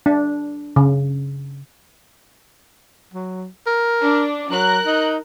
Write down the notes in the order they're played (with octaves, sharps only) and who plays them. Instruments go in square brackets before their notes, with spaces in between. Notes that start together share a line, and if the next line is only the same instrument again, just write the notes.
[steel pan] D4
C#3
[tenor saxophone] F#3
A#4
[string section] D4
[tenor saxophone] F#3 [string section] A#4 F#6
[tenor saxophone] D#4